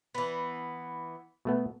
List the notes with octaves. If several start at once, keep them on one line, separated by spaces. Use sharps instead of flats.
E3 B3
B2 A3 B3